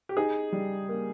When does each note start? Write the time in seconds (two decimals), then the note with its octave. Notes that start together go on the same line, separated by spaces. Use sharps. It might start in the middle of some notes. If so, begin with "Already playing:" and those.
0.09 G4
0.17 D#4 G#4
0.52 G3
0.89 A#3